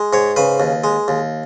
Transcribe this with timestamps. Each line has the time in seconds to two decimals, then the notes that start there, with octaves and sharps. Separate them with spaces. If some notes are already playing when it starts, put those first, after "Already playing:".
Already playing: G#3
0.13 G#2 C#5
0.36 C#3 B4
0.60 D#2
0.84 G#3
1.08 D#2